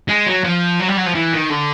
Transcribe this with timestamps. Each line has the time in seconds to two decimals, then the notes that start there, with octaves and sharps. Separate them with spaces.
0.08 G#3
0.27 F#3
0.44 F3
0.80 F#3
0.88 G3
0.98 F#3
1.06 F3
1.15 E3
1.33 D#3
1.50 D3